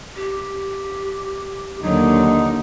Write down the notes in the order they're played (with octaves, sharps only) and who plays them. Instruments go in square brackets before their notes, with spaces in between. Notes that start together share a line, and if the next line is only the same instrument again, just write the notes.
[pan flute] G4
[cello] D#2 D3 [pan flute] F#3 [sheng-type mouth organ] D#4